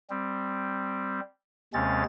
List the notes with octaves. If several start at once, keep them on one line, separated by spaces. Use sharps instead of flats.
G3 C4
D#2 C3 G#3 C4 C#4 A6